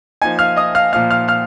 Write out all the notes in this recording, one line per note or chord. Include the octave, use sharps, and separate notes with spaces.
F3 A#3 D#4 G#5 G#6
F5 F6
D#5 D#6
F5 F6
A#2 F3 A#3 F5 F6
F5 F6
F5 F6